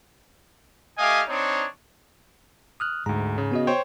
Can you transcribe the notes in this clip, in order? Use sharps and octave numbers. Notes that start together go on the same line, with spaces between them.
A3 G4 D#5 F5 G#5
C4 D4 D#4 C#5
D#6 F6 F#6
D2 G#2 G#3 A#5
C#3
B3 F#4 D#5
C5 C#5 G5